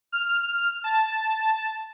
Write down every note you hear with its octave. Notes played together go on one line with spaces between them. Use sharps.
F6
A5